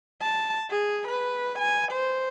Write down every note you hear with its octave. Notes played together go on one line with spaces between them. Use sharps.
A5
G#4
B4
G#5
C5